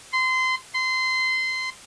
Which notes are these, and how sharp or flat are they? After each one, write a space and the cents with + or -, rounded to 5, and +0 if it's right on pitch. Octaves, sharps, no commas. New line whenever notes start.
C6 -25
C6 -20